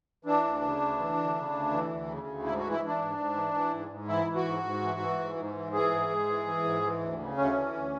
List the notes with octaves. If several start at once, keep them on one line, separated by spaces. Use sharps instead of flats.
E3 D4
D2
C#3
D2
E3
D2
C#3
D2
E3
D2
C#3
D2
G#2 E4
F#4
E3
E4
E3 D4
G#2
G#2
E3
E3
G#2
G#2
E3 E4
E3
F#4
G#2
G#2
E3
E3
G#2
G#2
E3
E3 G#4
G#2
G#2
E3
E3
G#2
E3
D2
C#3
D2 C#4
E3
D2